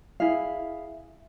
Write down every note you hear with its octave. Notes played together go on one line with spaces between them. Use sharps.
E4 G#4 F5